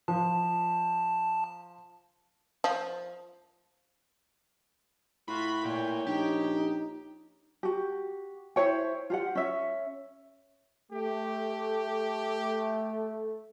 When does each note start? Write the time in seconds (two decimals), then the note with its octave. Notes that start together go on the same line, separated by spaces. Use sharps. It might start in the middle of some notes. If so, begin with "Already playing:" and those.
0.08 F3 A5
2.64 F3
5.28 A2 F4 F#4 B5
5.65 A#2 C#5 G5
6.07 A#1 D#4 G4
7.63 F#4 G4
8.56 E4 C5 C#5 G5
9.10 F4 G4 F#5
9.35 C#4 E5
10.92 A3 G4